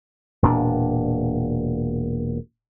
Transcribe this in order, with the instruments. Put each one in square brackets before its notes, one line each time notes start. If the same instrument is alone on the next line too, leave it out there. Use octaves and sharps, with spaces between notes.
[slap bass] E1 A#2 D4